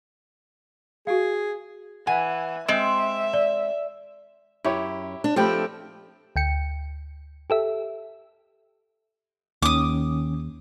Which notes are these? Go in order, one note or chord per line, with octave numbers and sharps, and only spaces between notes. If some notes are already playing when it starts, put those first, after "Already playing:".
F#4 G#4 F5
E3 F#5 G#5
G#3 C4 E5 D7
D5
F#2 E4 G4 C#5
D4
F3 A3 C4 G4 G5 B5
D2 G5 C#7
G4 A4 E5
D#2 D#3 C#4 D6 D#6